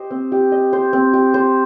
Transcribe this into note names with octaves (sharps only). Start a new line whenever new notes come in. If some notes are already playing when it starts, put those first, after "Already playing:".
Already playing: G4 C5 D#5
C4
G4
D#5
C5
C4
G4
C5